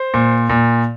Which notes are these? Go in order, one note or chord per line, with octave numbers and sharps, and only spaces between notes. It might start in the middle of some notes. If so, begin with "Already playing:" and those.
Already playing: C5
A#2
A#2